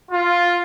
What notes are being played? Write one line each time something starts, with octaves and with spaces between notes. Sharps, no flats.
F4